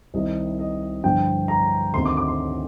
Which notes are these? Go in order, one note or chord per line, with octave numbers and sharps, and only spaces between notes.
C2 C3 D#3 D#5
D#5
G2 D3 F3 G5
A#5
D2 C3 D#3 C6
D6
D6
C6